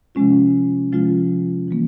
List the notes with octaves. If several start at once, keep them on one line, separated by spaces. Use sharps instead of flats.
C3 F3 G#3 C#4 F4
C3 F3 G#3 C#4 F4
E3 G3 A#3